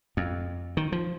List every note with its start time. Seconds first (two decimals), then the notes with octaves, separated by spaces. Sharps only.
0.17 F2
0.77 D#3
0.92 F3